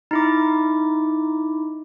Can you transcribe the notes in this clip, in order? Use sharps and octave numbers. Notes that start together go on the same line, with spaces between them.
D#4 E4 D6